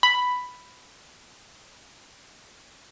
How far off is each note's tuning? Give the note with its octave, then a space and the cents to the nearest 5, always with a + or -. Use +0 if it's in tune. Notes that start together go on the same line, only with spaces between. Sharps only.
B5 +5